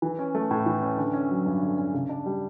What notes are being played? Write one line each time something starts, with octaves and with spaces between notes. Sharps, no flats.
E3
C#4
A3
A2
E3
C#4
D3
C#4
F#3
G2
D3
C#4
C#3
D4
G3